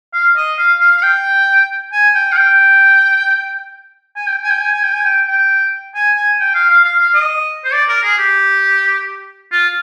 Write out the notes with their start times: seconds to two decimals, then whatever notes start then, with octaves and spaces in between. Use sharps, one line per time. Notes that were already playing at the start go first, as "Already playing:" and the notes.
0.13 F5
0.36 D#5
0.58 F5
0.80 F5
0.98 F5
1.03 G5
1.92 G#5
2.15 G5
2.32 F5
2.37 G5
4.16 G#5
4.27 G5
4.44 G#5
4.50 G5
4.61 G#5
4.72 G#5
4.83 G5
4.94 G#5
5.05 G5
5.28 G5
5.95 G#5
6.17 G#5
6.40 G5
6.54 F5
6.70 F5
6.84 F5
6.99 F5
7.14 D#5
7.64 C5
7.73 D5
7.89 A#4
8.03 G#4
8.18 G4
9.52 F4